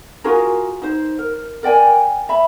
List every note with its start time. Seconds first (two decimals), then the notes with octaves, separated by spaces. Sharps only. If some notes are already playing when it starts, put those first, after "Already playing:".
0.24 F4 F#4 G#4 A#4
0.82 D#4 C5
1.19 A#4
1.63 A#4 D5 G5 G#5
2.29 E5 B5